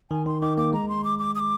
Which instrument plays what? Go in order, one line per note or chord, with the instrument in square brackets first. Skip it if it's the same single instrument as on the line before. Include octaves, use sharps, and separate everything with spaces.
[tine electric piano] D#3 [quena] G#5
[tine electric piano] D#3 [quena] C6
[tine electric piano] D#3 [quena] D6
[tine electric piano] A#3 [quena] D6
[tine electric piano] G#3 [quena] A#5
[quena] C6
D6
D6
D#6
D6